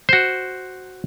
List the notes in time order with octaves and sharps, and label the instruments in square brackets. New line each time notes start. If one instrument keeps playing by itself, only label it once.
[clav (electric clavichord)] F#4 C5